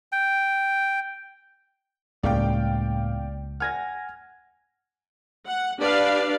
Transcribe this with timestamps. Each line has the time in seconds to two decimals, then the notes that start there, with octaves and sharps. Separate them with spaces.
0.12 G5
2.23 C#2 A2 C#3 A#3 B3 D5 F5 G5
3.60 F#5 G#5 F6 G#6 A#6
5.46 F#5
5.79 D4 G4 B4 D5 F5